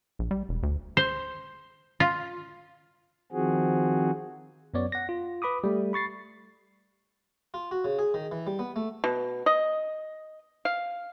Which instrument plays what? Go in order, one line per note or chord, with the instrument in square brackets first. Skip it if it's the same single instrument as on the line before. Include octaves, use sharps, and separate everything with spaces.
[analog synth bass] A#1
G3
E1
D2
[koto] C5
F4
[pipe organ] D#3 F3 C4 F#4 G#4
[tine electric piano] F#2 F#3 B3 C#5 D5
F#5 A#6
F4
B4 B5 D6 D#6
G3 A3
B5 C#6 A6 C7
[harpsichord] F4
F#4
C#3
G#4
D#3
E3
G3
B3
A3
[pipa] B2
D#5
F5